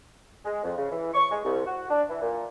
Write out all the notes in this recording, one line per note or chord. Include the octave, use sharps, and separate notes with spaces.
G#3
F2
C#3
E3
C#6
G#3
C2
F#4
D4
E3
A#2